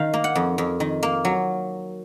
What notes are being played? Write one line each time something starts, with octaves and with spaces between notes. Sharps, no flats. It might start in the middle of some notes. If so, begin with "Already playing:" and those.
Already playing: D#3 F5
A#3
F#5
F2
F2
D#3
A#3
F#3